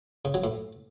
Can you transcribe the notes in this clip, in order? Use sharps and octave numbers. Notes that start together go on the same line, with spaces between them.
C#3
F#3
A2